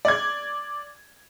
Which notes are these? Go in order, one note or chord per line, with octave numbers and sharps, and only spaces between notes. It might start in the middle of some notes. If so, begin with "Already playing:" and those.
D5 G#6